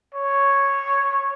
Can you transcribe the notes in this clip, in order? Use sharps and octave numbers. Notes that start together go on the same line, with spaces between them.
C#5